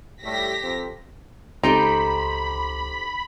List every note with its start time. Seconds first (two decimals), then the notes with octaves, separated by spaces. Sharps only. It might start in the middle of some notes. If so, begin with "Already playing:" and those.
0.23 A2 G3 A3 G4 A#6 B6
0.63 F2 C4
1.63 C#2 C4 D#4 G4 A4 B5 C6